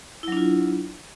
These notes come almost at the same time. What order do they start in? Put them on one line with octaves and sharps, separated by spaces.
E4 F#3 D4 F4